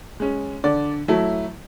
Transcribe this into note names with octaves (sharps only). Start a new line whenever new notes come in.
G#3 C#4
D3 D5
F#3 A3 E4